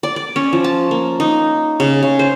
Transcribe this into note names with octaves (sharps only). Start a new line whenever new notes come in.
D5
D5
C#4
F3
A5
A#3
D#4
C#3
C#3
C5